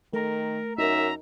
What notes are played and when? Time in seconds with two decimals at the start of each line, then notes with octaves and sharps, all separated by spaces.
0.13 D#3 A3 A#4 A#5
0.78 F#2 D#4 A#4 E5 A#5